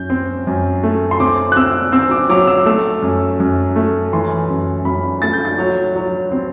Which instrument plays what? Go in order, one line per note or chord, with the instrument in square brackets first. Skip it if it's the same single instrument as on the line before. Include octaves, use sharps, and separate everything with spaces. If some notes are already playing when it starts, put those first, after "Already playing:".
Already playing: [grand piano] F#2 [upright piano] G6
[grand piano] C4
F#2
A3
[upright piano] C6
[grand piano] C4 [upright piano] D6
[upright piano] F#6
[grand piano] C4 [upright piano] E6
[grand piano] C4 [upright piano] E6
[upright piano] D6
[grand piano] F#3 [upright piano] D6
[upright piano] E6
[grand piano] A3 [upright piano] E6
[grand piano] F#2
F#2
A3
[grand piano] E3 [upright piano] C6
[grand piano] F#2
[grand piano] F#2 [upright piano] B5
[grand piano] A3 [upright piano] A6
[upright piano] G6
A6
[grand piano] F#3
F#3
C4